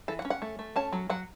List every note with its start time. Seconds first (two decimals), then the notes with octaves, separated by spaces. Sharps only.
0.08 E3 A4
0.19 F#5
0.25 C#4
0.30 F#5
0.42 A3
0.59 A3
0.76 C#4 A5
0.93 F#3
1.10 F#3 F#5